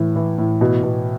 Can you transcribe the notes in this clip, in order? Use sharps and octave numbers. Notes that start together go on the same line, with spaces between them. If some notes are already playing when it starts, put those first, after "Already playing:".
Already playing: A2 E3
E3
A2
B2
B2